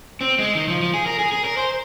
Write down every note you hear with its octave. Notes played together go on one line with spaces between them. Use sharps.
C4
G#3
D#3
F3
F3
G#4
A#4
G#4
G#4
A#4
C5